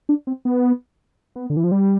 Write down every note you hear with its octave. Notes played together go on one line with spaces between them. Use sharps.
D4
C4
B3
B3
D3
E3
F3
G3